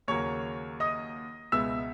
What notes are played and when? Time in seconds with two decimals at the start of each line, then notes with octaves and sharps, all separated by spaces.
0.08 D#2 C#3 F#3 A#3 C#5 C#6
0.80 D#5 D#6
1.52 C#2 B2 G#3 B3 E5 E6